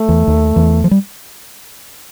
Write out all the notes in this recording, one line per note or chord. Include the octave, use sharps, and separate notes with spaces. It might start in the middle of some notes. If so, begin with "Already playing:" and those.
Already playing: A3
E2 E3
D#2 D#3
E2 E3
F3
G3